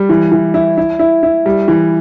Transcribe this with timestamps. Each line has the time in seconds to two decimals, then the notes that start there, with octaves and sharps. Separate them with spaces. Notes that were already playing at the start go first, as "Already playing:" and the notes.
Already playing: G3
0.09 E3
0.32 E3
0.54 E4
0.78 E4
0.99 E4
1.23 E4
1.46 G3
1.68 E3